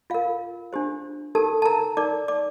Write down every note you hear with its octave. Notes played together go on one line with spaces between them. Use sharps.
F4 A#4 F5
D4 G4 C5
D#4 G4 A4 A#4 A5
A5
A#4 A#5
D#4 A#4 D5 D6
D5 D6